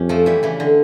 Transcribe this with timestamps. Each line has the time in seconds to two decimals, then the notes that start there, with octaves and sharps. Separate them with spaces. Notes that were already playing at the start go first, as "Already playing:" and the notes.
Already playing: F2 C#4 G4
0.09 F3 A3
0.26 E3 G3
0.43 C#3 E3
0.60 D3